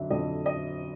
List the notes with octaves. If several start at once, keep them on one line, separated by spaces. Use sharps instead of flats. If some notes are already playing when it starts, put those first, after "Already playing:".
Already playing: F2 D3 F#3 E5
F2 D3 F#3 D#5
D#5